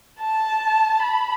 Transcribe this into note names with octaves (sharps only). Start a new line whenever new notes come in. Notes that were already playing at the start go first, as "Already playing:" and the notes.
A5
B5